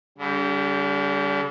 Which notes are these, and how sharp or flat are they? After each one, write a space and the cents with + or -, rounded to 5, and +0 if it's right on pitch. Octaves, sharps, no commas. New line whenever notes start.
D3 -45 G3 +0